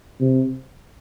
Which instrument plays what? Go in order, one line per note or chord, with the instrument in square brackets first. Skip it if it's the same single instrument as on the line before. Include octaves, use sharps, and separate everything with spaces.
[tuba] C3